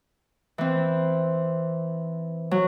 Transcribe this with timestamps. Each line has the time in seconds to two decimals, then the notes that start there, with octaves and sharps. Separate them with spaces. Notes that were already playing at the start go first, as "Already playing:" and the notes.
0.58 E3 C4
2.51 F#3